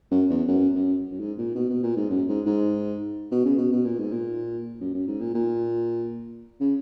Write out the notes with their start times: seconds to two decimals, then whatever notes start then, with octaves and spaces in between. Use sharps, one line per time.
0.11 F#2
0.30 E2
0.48 F#2
0.75 F#2
1.12 F#2
1.20 G#2
1.38 A#2
1.55 B2
1.69 B2
1.83 A#2
1.96 G#2
2.10 F#2
2.28 G#2
2.46 G#2
3.31 B2
3.45 C#3
3.58 B2
3.72 B2
3.85 A#2
3.98 G#2
4.12 A#2
4.80 F#2
4.94 F#2
5.08 G#2
5.20 A#2
5.34 A#2
6.60 C#3